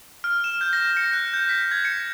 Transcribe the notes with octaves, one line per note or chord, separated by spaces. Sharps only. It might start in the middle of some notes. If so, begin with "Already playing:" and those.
F6
E7
G6
A#6
C#7
F#6
G6
B6
G#6
C#7